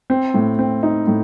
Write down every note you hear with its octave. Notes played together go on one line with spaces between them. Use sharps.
C4
A2
C4
D#4
A2